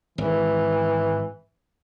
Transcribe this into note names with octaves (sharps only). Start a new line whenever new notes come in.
G#1 E3